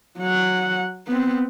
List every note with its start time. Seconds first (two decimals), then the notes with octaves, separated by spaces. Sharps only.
0.19 F#3 F#5
1.07 B3 C4